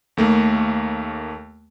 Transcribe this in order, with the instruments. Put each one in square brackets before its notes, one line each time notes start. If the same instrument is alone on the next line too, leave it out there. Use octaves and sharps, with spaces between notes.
[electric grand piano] D#2 A3 A#3